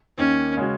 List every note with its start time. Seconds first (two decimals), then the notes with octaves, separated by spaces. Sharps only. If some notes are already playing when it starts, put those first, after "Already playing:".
0.18 D#2 D#3 A#3 C#4
0.57 C#3 G#3 C#4 F#4